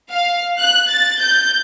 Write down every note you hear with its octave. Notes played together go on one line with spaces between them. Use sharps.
F5
F#6
A6
G6